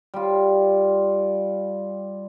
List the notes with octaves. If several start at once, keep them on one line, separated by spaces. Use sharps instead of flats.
G3 F4